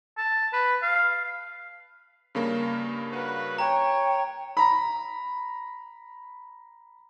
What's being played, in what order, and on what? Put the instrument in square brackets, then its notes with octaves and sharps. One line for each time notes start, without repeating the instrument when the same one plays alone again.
[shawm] A5
B4
F5
[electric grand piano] G2 C#3 A#3
[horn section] F#4 B4
[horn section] C#5 [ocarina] G5 [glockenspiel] A#5
[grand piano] A#5 B5